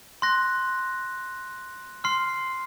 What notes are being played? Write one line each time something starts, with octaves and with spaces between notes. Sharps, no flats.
C6 F#6 A#6
C6 F6 C7